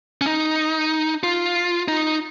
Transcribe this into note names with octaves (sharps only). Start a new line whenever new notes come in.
C#4
D#4
F4
D#4